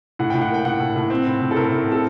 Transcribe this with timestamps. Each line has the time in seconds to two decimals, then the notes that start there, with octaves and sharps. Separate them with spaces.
0.19 A2 F#5
0.30 A2 G5
0.42 F#5
0.50 A#3 G5
0.65 A2 F#5
0.80 A2
0.96 A2
1.10 C4
1.27 A2
1.42 A2
1.51 A4
1.56 A2 A#4
1.72 A2
1.86 C4
1.92 A4